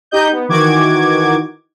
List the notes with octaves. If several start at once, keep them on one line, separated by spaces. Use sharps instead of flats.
D#4 G4 D#5 G6
B3
D#3 E3 F#4 D6 G#6